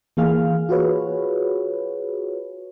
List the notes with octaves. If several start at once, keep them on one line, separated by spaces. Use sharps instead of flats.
E3 A#3 G#4 F5 F6
F4 F#4 G#4 B4 C#5